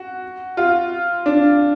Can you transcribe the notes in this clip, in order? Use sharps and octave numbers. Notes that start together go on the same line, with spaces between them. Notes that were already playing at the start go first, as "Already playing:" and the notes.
Already playing: F#4
F4
D4